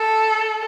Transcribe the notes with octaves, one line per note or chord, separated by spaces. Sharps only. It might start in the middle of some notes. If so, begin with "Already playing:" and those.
Already playing: A4